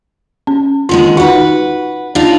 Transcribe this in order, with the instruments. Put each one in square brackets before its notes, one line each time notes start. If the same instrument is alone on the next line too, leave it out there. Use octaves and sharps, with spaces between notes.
[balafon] C#4
[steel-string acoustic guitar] D3 D#3 G#3 [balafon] F4
[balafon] D#4 F#4 [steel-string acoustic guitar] B4 F#5
[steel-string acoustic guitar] D4 D#4 F4